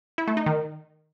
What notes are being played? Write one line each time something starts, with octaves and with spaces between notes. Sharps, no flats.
E4
A3
D#4
D#3